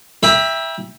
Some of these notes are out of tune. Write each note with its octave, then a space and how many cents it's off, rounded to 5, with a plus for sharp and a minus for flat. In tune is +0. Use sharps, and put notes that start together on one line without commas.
E5 +0 G5 +25 B5 -45